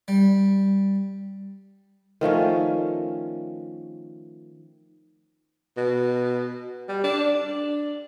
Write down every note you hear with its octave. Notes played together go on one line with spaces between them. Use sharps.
G3
D#3 F3 A3 C#4
B2
G3
D4
D4